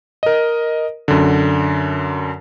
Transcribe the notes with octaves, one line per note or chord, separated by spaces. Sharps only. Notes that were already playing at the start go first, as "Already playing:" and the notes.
A#4 D#5
F#2 D3